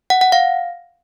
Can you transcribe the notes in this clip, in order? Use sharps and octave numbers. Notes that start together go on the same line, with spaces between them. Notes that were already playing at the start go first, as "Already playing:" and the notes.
F#5
F#5
F5